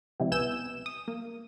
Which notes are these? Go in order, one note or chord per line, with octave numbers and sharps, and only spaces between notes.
C3 F3 G3 G#3 E4
C2 B3 G#5 E6 G6 E7
D#6
A#3